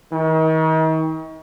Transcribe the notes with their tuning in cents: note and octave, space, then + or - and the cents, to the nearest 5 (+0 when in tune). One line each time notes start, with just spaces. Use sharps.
D#3 +40